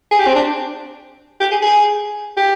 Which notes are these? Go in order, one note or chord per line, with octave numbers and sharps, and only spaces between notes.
G#4
G4
C4
D4
G4
G#4
G#4
G4